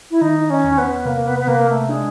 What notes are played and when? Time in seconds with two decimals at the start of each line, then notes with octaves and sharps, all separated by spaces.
0.11 E4
0.21 D#3 D#4
0.50 C#4
0.64 E2
0.78 B3
1.05 C3 A#3
1.26 B3
1.39 B3
1.47 C3 A#3
1.69 A3
1.89 G#3 D4